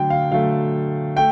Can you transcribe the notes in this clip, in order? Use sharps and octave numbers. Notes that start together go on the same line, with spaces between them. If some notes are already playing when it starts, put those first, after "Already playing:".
Already playing: D3 F#3 A3 G5
F5
D3 F#3 A3 F5
A3 G5